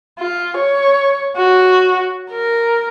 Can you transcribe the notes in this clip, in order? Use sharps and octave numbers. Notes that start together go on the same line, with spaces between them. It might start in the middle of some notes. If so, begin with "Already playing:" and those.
F4
C#5
F#4
A#4